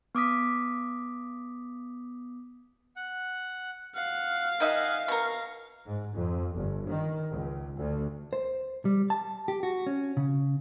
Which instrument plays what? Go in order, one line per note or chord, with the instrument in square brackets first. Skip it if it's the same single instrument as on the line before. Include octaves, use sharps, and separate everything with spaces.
[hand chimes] B3 D6 D#6 B6
[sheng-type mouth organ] F#5
[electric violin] F5 [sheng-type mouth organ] F#5
[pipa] D#3 D#4 E5 [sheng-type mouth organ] D#5 F#5 G#5
[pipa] B2 A#4 [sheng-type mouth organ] C#6
[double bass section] G#2
F2
G1
D#3
C#2
D2
[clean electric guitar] C5
G3
A5
G4
F#4
C#4
C#3